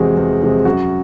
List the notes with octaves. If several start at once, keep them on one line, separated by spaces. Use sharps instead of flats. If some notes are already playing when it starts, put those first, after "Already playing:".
Already playing: E2 C3 F3 G#3 F#4
E2
C3 F3 G#3
F#2 F#4